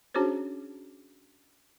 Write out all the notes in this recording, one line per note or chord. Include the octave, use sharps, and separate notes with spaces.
C#4 D4 F#4 G#4 C5 C#5